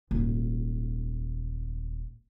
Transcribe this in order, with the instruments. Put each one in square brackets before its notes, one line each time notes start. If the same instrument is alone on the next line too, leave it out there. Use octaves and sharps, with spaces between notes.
[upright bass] D#1 G#1